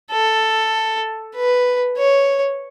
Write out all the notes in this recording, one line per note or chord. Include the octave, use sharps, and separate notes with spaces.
A4
B4
C#5